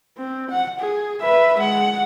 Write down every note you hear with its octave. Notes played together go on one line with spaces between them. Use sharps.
C4
F#5
G#4
B4 E5
G#3 F#5